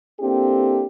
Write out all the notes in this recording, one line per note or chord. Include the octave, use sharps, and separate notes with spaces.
A#3 C4 D4 E4 G4 A4